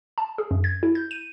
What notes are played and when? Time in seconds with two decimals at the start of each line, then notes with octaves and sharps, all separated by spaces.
0.18 A5
0.38 G#4
0.51 F#2
0.64 G#6
0.83 E4
0.95 G6
1.11 D#7